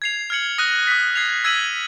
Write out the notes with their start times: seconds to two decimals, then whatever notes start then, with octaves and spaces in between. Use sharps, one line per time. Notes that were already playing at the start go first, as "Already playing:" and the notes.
0.02 G#6 C7 F7
0.30 F6 G#6 C#7 F#7
0.58 D#6 F#6 A#6 D#7
0.87 D#6 F#6 B6
1.15 G#6 C7 F7
1.44 E6 G#6 B6 D#7 F#7